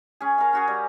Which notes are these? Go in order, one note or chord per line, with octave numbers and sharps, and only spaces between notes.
C#4 G#4
A#4 F5
C#4 F#4 G#4
G3